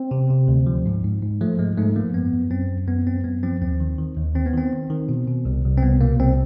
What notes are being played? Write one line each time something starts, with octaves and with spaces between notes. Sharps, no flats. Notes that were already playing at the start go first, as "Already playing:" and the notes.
Already playing: C4
C3
C3
D2
F3
G#2
G#2
G#2
F3 A3
G#2 G#3
G#2 A3
F3 A#3
F#2 B3
F#2
F#2 C4
F#2
F#2 B3
F#2 C4
F#2 B3
F3 C4
D#2 C4
D#3
D#3
D#2
D#3 C4
B3
D#3 C4
D#3
D#3
B2
B2
C2
C2
C4
C2 B3
B2 A#3
C2 C4